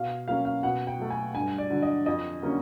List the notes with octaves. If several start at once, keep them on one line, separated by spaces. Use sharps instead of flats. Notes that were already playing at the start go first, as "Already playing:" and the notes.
Already playing: B2 F5
F#3 A#3 C#4 F5
F5
B2 F#5
G5
F#3 A3
G#5
G2 G#5
D5
D3 F#3
D#5
F2 D#5
D3 F#3 A#3 C#4